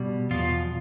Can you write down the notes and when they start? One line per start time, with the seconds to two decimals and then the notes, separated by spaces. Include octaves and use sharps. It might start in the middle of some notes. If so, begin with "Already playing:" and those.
Already playing: B2 G3
0.31 E2 B2 F3 F4